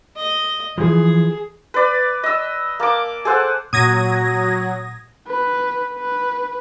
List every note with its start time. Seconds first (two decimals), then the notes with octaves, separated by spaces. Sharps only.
0.16 D#5
0.78 E3 F3 G#4
1.74 B4 D5
2.24 D#5 E6
2.80 A#3 A5 D6
3.25 G#4 A4 C5 F#5
3.73 A#2 F#3 D#6 G#6 A#6
5.28 B4
5.96 B4